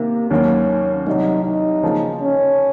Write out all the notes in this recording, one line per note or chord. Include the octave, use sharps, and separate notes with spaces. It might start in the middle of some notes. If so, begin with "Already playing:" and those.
Already playing: C3 D#3 A#3
D#2 D#3 F#3 A#3 C#4
C2 C3 F#3 D#4
D#4
C#3 F3 A#3 F4
C#4